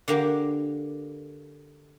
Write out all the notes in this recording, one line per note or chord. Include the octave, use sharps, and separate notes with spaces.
D3 A#3 G4